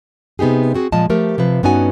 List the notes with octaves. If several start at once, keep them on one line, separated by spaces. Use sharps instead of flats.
C3 B3 D#4 G4 G#4
C4 F#4 G#4
A#2 F3 G#3 D#5 A5
F3 A3 G4 A#4
C3 F3 B4
G2 B3 C#4 D#4 F#4 G#5